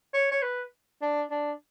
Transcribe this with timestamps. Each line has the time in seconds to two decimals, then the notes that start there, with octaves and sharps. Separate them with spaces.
0.14 C#5
0.31 C#5
0.42 B4
1.02 D4
1.31 D4